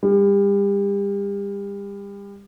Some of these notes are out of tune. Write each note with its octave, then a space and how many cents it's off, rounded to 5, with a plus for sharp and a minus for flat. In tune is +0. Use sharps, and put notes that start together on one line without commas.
G3 +35